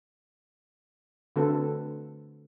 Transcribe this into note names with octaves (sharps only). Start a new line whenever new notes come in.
D3 A3 C4 F#4 A4 B4